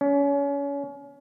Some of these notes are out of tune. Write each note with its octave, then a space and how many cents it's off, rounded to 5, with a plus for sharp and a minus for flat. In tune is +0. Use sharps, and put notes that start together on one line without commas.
C#4 +30